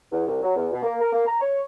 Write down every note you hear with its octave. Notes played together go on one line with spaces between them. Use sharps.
E2
C2
F#3
E2
B2
A#3
A#4
A#3
A#5
C#5